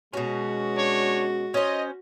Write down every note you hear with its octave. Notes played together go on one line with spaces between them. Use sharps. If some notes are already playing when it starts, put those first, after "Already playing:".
B2 G#3 C#4 F#4
D4 C#5
C#4 C5 D#5